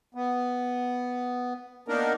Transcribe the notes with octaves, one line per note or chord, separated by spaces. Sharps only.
B3
A#3 B3 D4 D#4 A#4